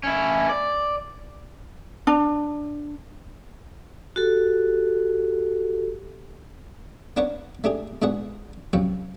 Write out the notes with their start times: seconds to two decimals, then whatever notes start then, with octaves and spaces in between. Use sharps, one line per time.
0.04 C#4 E4
0.49 D5
2.07 D4
4.16 F#4 G4 A4
7.17 B3 D4 A#4 C#5 D5 F#5
7.64 A3 D4 G4 G#4
8.02 G#2 B2 D4 G#4 F#5
8.73 C2 F#2 F3 G5 C#6